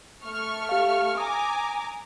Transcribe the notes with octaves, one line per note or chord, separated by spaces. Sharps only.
A3 C#6 F6
G4 F5
G#5 A#5 D6 D#6